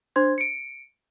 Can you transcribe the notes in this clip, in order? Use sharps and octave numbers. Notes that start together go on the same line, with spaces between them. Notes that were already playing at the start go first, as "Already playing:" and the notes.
D4 C5 C6 G#6
C#7 D7